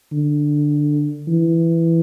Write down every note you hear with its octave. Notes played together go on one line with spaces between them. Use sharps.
D3
E3